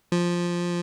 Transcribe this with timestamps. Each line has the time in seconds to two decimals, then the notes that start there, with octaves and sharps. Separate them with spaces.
0.12 F3